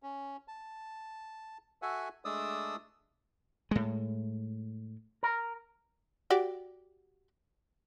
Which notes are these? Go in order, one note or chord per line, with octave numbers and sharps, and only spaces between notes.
C#4
A5
F#4 A4 E5 F#5 G#5
G#3 A3 D4 D5 D#6 E6
A2 G#3
A#4
F#4 G4 D5